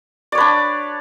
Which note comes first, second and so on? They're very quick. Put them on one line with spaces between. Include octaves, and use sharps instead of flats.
D5 C#5 B4 D4